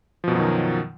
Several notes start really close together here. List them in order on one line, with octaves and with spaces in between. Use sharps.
F3 B2 F#2 F#3 D#3